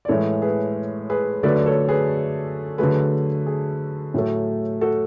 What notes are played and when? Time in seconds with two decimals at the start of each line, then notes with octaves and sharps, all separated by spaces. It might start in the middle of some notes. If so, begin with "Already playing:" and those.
0.05 D5
0.08 A2 E3 G#3 A4 C#5
0.42 G#4 B4
1.10 G#4 B4
1.43 D3 F#3 A3 B4 D5
1.56 D5
1.66 A4 C#5
1.89 G#4 B4
2.78 D3 F#3 A3 G#4 B4
3.46 G#4
4.14 A2 F#3 A3
4.81 F#4 A4